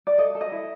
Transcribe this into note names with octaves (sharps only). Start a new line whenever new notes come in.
D5
A4 D#5
A4
D#5
E4